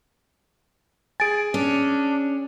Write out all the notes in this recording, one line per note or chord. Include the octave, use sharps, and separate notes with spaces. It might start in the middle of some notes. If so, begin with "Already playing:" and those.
G#4 G#5 A6 D7
C#4 D4